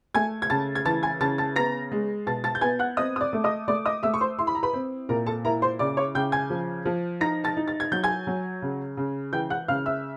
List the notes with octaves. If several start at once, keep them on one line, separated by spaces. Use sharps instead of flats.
A3 G#5 G#6
G#6
C#3 A5 A6
G#6
E3 A5 A6
G#5 G#6
C#3 A5 A6
A5 A6
B3 A#5 A#6
G#3
B2 A5 A6
A5 A6
G6
B3 G#5 G#6
F#5 F#6
C4 D#5 D#6
D#6
D5 D6
A3
D#5 D#6
A3 D5 D6
D#5 D#6
A3 E5 E6
C#6
C5 C6
E4 C6
B5
A#5
B4 B5
C4
A#2 A#4 A#5
A4 A5
E4 A#4 A#5
C5 C6
C#3 D5 D6
C#5 C#6
C#3 G5 G6
G#5 G#6
F3
F3
D#4 A#5 A#6
A5 A6
D#4
A6
G#6
F#3 G6
G#5 G#6
F#3
C#3
C#3
E3 G5 G6
F#5 F#6
C#3 F5 F6
E5 E6